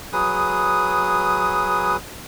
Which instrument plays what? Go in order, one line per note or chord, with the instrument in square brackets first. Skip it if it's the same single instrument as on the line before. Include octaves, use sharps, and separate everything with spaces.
[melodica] F#3 G#4 B4 D#6